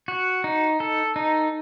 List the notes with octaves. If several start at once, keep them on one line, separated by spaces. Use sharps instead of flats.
F#4
D#4
A4
D#4